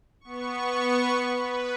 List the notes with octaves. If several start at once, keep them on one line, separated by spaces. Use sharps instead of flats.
B3 C#6
B4